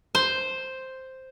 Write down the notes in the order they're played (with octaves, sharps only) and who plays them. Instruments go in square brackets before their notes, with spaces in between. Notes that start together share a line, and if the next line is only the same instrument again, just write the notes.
[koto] C5